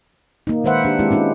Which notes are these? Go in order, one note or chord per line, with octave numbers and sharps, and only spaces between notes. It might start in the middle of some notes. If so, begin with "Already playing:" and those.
A#3 D#4
D#3 G#3 B4 C5 E5 F#5
D4 G4
G#3 C4 E4 G4
G#3 C#4 D#4 F4